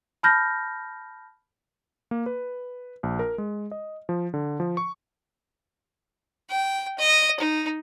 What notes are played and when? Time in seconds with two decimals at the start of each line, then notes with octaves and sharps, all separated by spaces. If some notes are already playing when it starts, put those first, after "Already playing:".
0.23 A5 B5 F6 G6 A#6
2.11 A#3
2.26 B4
3.03 A#1
3.19 A#4
3.38 G#3
3.71 D#5
4.09 F3
4.34 D3
4.60 F3
4.77 C#6
6.49 G5
6.98 D#5
7.39 D#4